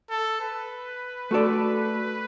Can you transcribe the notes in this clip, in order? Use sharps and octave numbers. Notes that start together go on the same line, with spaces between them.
A4
B4
A3 F#4 A4 D5